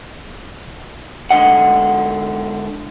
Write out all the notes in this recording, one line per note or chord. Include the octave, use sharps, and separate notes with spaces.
G#2 D3 D#5 F#5